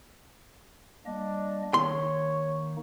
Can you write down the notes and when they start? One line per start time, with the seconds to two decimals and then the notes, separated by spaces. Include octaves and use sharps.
1.06 G3 A#3 D4 D#5
1.74 D#3 A#3 D#4 C#5 C6